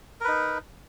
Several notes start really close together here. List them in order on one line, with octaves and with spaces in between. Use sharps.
A#4 B4 D#4